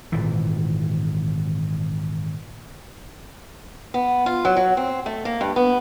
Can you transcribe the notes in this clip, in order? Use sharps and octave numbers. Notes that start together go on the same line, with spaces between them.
G#1 A#2 E3
B3
F4
F#3
F#3
C4
A3
A#3
G2
B3